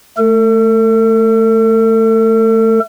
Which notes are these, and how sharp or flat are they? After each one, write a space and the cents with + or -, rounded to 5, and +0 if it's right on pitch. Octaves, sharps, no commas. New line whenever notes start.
A3 +0 A4 +40